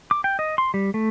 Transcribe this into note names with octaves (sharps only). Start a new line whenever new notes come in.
D6
G5
D#5
C6
G3
A3